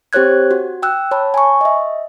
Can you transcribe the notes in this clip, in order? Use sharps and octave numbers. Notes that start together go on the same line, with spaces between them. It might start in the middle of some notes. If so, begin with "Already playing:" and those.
C4 G4 C5 C#5 F#6 G#6
F#4
G5 E6 F#6
C#5 A5 B5
G#5 A#5 C#6
D#5 E5